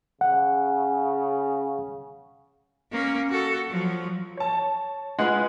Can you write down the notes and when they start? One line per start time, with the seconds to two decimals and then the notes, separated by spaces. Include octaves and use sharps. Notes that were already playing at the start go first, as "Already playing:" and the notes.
0.21 C#3 F#5
2.91 A#3 C#4
3.30 F#4 A4
3.68 F3 F#3
4.37 C#5 A5
5.19 G#3 F4 B4 F#5